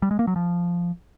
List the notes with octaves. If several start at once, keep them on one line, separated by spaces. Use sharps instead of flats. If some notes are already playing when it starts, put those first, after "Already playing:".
G3
G#3
A#3
F#3
F3